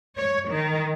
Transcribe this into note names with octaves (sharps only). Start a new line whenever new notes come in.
C#5
D#3